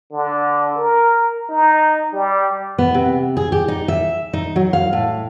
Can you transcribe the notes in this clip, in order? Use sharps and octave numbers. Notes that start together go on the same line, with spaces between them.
D3
A#4
D#4
G3
B3
C3
G#4
G4
D#4
E5
D#4
F#3
F5
A2